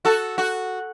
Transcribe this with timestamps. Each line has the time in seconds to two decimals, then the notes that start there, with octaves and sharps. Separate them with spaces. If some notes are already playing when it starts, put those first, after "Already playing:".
0.05 F#4 A4
0.38 F#4